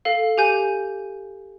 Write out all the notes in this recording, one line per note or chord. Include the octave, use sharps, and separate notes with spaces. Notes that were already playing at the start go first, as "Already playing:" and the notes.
A4 F5
G4 G#5 G6 D#7